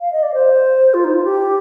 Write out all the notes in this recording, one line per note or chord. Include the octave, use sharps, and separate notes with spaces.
F5
D#5
D5
C5
F4
D#4
F4
G4